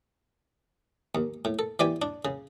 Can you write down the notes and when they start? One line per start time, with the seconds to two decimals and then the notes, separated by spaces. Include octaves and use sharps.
1.15 D#2
1.45 A2
1.59 A4
1.79 E3 G4 D5 G#5
2.02 D4
2.25 C#3